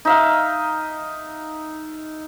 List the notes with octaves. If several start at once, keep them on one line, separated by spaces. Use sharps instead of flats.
D#4 E5 F5